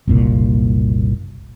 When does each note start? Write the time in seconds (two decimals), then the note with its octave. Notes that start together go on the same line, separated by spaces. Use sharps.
0.07 F#1 C2 A#2